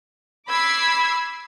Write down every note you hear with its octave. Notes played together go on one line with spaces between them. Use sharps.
B5 D6 E6 G#6 B6 C7